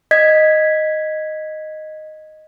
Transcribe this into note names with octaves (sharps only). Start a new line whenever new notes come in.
D#5 G#6 B6